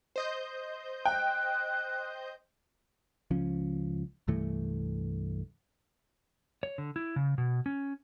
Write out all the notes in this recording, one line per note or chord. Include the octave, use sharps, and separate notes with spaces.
C5 D#5 G6
G5 F#6
C#2 F3 C#4
C2 G2 E3 A3
C#5
D3
E4
C#3
B2
C#4